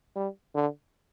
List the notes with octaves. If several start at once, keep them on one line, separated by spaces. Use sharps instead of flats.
G3
D3